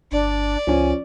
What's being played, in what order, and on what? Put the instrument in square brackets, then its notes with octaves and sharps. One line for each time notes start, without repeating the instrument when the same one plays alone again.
[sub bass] G1 [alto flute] D4 [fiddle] D5
[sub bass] C#2 [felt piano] F3 C#4 [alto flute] G#5